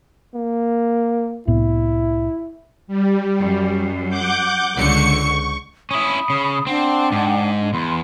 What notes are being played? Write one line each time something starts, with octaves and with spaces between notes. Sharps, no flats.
A#3
C2 A2 B3 E4
G3
F#2
F#5 D6 G6
C#2 D3 C#6 C#7
C#4 E4 B5 D#6
C#3
C4 D4 F#5 G5
G#2
D4
E2 B5 C6